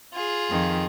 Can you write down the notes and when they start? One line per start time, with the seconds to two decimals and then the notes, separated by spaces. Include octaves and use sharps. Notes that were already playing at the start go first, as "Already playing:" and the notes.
0.13 F4 G#4
0.49 F2 D#3